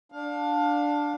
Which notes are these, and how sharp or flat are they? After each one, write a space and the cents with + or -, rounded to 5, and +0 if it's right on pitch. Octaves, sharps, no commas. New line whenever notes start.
D4 +0 F5 +25